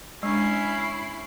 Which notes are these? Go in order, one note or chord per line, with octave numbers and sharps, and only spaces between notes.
G#3 C#4 D4 E4 C7